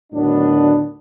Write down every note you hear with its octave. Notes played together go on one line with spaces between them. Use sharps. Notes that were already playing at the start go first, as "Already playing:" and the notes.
D2 A2 D#3 F#3 B3 D4